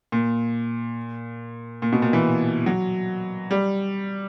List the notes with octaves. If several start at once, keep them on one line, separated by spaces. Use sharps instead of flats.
A#2
A#2
B2
A#2
E3
F#3
G3